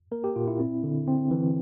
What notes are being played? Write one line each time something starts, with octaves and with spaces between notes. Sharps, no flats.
A#3 A#4
G4
A#2 F4
E4
C4
D3
C4
E3